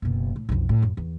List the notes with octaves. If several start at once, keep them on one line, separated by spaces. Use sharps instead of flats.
F#1 B2
A2
B1 F2
A2
F#2
E2